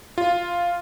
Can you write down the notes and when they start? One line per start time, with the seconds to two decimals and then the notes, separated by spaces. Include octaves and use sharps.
0.18 F4